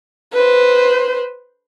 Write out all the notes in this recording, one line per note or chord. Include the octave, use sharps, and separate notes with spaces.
B4 C5